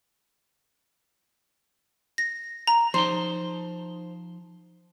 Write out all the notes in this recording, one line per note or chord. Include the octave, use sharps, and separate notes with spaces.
A#6
A#5
F3 D#4 C5 C6